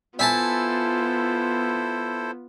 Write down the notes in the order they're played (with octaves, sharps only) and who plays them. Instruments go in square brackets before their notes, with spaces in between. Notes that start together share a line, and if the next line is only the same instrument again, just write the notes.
[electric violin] B3 F4 [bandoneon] E4 A4 C5 [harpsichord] E5 G#5 A5